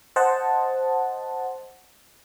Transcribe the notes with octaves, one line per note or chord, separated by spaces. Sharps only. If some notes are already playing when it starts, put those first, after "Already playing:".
C5 D#5 F#5 A5